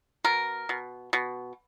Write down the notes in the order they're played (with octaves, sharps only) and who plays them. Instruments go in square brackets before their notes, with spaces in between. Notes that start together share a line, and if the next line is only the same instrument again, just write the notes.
[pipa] B2 A#4
B2
B2